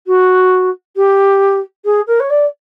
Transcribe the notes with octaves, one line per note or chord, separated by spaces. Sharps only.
F#4
G4
G#4
A#4
C#5
D5